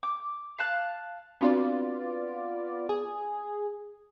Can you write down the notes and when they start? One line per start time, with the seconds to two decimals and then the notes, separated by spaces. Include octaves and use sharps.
0.03 D6
0.58 F5 A5 F#6
1.41 B3 C4 D4 F4 F#4 D5
2.89 G#4